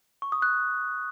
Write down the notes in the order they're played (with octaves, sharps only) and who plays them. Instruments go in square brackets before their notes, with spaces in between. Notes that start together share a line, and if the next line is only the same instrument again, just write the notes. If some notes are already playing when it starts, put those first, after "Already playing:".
[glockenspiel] C#6
D#6
F#6